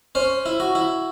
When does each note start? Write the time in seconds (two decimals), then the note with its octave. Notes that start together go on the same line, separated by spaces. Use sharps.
0.15 C#4 C5
0.46 E4
0.60 F#4
0.75 E4